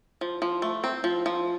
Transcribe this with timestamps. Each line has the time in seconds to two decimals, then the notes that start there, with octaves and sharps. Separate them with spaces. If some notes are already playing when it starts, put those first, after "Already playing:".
0.21 F3
0.42 F3
0.62 A3
0.84 C4
1.04 F3
1.26 F3